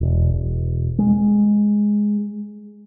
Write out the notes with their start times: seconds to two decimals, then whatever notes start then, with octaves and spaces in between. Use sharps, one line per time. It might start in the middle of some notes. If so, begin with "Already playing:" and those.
0.01 E1
0.34 E1
0.99 G#3